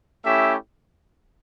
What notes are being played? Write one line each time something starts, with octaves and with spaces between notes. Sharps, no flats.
A3 C#4 E4 G4 E5